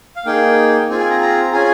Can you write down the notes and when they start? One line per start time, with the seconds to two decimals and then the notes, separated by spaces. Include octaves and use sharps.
0.16 F5
0.26 A#3 D#4 G#4 G5
0.89 C4 F4 G#4 G#5
1.00 G#5
1.10 A#5
1.21 A#5
1.53 C#4 F4 G#4 G#5